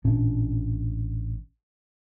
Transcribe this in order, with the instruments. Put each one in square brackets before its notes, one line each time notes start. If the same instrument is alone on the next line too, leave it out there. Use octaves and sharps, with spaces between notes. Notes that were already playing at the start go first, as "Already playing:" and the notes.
[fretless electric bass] A1 A#2 C#4 D4